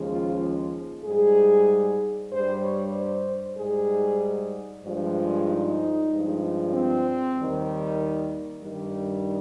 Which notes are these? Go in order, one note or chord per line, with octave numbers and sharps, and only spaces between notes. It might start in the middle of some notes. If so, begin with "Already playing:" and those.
Already playing: D#2 C#3 F3 G#3
F4
G#2 G3 G#4
G2 G3 C5
C#5
C5
G#2 G3 G#4
G2 F3 G#3
D#4
G2 F3 G#3
C4
D#2 D#3 G3
G2 D#3 G3